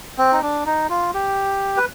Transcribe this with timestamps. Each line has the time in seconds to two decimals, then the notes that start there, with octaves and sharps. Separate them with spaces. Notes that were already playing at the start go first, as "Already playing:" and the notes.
0.18 C4
0.33 D#4
0.42 D4
0.66 D#4
0.89 F4
1.14 G4
1.77 B4